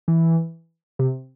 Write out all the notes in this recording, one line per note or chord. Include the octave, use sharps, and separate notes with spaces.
E3
C3